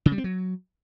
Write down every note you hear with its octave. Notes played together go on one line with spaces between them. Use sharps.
C#3
G3
C4
F#3